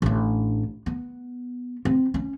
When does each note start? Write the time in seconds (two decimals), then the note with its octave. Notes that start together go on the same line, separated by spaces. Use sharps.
0.02 A1 D4
0.86 B3
1.85 C4
2.14 C#4